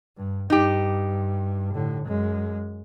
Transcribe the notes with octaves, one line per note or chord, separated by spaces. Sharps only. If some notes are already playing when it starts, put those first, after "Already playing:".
G2
G2 D#4 G4
A2 D3
F#2 G#3